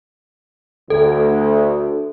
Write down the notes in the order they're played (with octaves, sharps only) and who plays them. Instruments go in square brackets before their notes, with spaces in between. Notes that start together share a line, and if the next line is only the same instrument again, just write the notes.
[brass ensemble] D2 [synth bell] A4